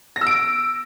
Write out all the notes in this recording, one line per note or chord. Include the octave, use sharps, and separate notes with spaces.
A#6
E6
D7